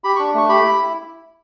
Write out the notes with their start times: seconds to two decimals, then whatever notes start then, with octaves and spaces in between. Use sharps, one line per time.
0.04 G4 B5
0.16 C#6
0.19 D4
0.34 A3 C#6
0.49 G4 B5
0.63 E4